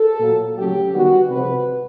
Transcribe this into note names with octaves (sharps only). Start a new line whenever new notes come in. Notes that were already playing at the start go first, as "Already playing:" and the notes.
Already playing: A4
A#2 F#3 A#3
C#3 F#3 A3 G4
D#3 G3 B3 F#4
C3 F3 G#3 B4